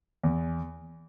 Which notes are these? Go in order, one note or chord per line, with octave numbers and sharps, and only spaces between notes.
E2